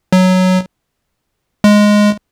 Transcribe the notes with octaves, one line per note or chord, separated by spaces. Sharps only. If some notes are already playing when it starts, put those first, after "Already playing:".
F#3
G#3